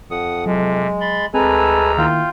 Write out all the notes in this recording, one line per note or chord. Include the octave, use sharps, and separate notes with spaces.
F2 F#5 D#6
C3 F#3 G#3
B5 C6 A6
D2 G#3 C4 A4 B4 G#5 A#5 E6
D#3 A#3 E4 F4 F5 G5